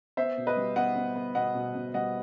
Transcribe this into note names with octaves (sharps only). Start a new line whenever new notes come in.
B3 C5 E5
B2
B4 D#5
G3
B3 D#5 F#5
B3
B3
B2 D#5 F#5
B2
B2
G3 D#5 F#5